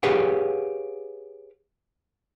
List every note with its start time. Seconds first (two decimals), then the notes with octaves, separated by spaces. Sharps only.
0.03 G4 G#4 B4 C#5 F5 F#5